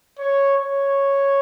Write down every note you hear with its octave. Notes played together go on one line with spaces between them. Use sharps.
C#5
C#5